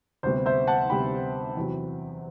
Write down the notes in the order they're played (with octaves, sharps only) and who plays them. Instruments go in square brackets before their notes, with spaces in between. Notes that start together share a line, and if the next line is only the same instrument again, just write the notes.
[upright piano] D2 C3 G3 B3 C5
C5 E5
F#5 A5
D2 C3 G3 B3 G5 B5
E2 C3 F#3